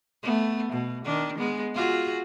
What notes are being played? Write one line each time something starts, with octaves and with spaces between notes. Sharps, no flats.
A3 B3
B2
D#3 D4
G#3 B3
F4 F#4 G#4